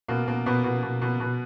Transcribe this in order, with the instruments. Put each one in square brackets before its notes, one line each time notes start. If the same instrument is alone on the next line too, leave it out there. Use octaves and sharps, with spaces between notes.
[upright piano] B2 A#3
B2 A#3
B2 B3
B2
B2
B2
B2